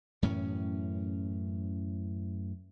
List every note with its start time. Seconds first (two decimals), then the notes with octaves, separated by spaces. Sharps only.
0.22 F#2 A2 E3 C#4